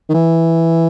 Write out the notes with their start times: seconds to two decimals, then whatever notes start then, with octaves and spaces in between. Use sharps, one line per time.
0.09 D#3
0.14 E3